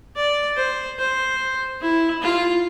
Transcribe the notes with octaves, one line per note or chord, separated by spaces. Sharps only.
D5
C5
C5
E4
F4